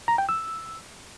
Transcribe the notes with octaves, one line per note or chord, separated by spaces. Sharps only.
A#5
G5
E6